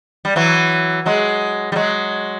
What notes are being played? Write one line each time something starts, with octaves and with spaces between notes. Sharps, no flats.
G3
E3 F#3
F#3 G#3
G3
F#3 G#3